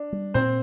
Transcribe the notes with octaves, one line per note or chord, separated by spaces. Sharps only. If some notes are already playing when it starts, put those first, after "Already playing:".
Already playing: D4
G3
A#2 C4 C5